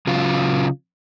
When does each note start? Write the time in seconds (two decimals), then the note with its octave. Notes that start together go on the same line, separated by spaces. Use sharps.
0.07 C#3 F#3 F4